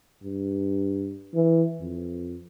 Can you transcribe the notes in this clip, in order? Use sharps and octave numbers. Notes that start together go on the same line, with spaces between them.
G2
E3
F2